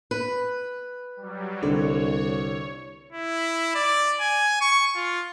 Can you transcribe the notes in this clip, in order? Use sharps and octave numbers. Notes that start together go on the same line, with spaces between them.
B4
F#3 G3
C2 D3 C#5
E4
D5
G#5
C#6
F4